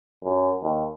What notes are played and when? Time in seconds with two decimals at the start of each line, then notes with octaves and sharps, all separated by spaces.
0.24 F#2
0.62 D#2